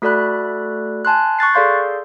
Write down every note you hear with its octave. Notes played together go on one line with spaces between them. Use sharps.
A3 F#4 A4 D5 B5 F#6
G#5 A5 C6 F#6
C#6 F#6 A6 C7
G#4 A4 D5 F5 C6 G6